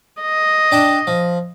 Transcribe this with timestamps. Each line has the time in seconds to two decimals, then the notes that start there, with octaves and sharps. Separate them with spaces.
0.22 D#5
0.71 D4 G5 A5
1.07 F3